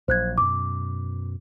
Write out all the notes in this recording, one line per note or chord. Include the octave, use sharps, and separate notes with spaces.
A#1 F#3 C5 F#6 G#6
F#2 B2 D6